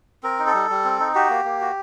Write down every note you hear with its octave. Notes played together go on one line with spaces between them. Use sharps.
C4 A#4
D#4
A4
G3
G3
C4
D#4
F#4 G4
A#3
A#3
F#4